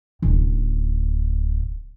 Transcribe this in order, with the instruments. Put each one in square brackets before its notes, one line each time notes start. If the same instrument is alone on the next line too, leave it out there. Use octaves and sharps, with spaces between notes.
[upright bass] D1 C#4